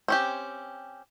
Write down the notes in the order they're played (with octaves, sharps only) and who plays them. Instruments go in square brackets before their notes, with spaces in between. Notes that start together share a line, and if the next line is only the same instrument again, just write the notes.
[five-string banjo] C4 C#4 G4